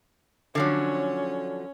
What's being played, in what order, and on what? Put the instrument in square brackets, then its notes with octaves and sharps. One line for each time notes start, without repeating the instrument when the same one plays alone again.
[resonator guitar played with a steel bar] D3 F3 F#3 [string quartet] C#4